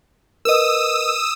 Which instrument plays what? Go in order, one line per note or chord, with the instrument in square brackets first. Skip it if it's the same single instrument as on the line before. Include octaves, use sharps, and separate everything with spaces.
[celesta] A#4 B4 D#5 [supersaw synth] D#6 E6